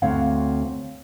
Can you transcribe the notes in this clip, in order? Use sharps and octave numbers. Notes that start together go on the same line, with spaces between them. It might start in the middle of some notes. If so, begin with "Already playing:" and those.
D2 C4 C#5 F5 F#5